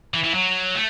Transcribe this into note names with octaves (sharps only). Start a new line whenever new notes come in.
E3
E3
F#3
A3